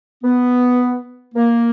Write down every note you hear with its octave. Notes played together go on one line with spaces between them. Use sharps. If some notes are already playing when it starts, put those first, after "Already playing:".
B3
A#3